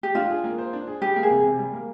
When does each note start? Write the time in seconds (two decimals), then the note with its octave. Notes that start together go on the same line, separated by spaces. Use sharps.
0.03 G4
0.15 D4 F4
0.30 G#4
0.44 A#3
0.58 C5
0.73 D4
0.87 G#4
1.01 G3 G4
1.16 A#3
1.23 G#4
1.30 C3
1.44 C3
1.58 G3
1.73 A#3